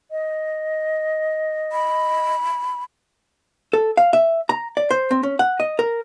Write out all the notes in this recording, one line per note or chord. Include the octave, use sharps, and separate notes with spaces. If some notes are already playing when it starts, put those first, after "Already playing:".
D#5
B5
A4
F5
E5
A#5
D5
C5
C4
C#4
F#5
D#5
A#4